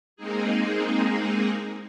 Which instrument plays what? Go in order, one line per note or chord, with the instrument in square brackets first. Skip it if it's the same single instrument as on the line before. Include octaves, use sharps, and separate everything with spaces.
[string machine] G#3 A#3 C4 D#4 G#4